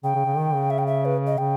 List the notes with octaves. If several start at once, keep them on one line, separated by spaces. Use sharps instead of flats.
C#3 G5
C#3
C#3
D#3
C#3
E5
G5
E5
B4
D#5
C#3 G5